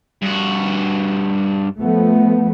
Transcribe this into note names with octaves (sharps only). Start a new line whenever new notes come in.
G2 F#4
F3 A3 B3